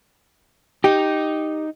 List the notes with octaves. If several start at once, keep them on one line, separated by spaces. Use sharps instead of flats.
D#4 G4 D#5